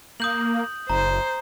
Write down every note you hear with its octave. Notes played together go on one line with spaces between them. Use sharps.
A#3 D#6 G6 F#7
F#1 C5 A#5